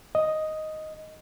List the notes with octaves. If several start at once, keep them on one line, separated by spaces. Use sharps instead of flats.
D#5